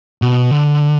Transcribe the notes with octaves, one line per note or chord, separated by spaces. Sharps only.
B2
D3